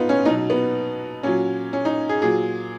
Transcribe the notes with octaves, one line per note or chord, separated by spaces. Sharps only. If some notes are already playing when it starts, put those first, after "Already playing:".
Already playing: B3 D#4 F4
C#4
B2 F#3 D#4
B3
A#2 F#3 C#4
C#4
D#4
G#4
A#2 F#3 G#4